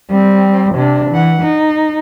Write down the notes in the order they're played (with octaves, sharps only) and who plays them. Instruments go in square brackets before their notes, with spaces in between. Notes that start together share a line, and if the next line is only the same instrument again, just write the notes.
[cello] G3 C4
C3 D4
E3 F#5
D#4